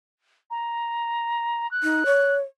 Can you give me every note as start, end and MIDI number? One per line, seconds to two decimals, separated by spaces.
0.50 1.69 82
1.71 2.34 90
1.83 2.04 63
2.06 2.40 73